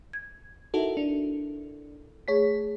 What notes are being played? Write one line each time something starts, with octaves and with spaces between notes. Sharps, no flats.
G#6
D#4 E4 F#4 A4 A#4 E5
D4 A4
A3 G#4 C#5 B6